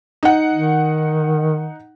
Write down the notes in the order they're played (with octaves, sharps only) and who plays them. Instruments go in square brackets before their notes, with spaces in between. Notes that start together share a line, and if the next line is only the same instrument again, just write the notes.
[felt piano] D#4 F#5
[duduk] D#3